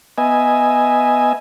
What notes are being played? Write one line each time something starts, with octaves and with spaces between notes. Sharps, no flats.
B3 D#5 E5 G#5